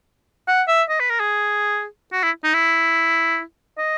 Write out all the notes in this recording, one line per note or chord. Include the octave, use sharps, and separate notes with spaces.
F#5
E5
D#5
B4
A#4
G#4
F#4
E4
D#4
E4
D#5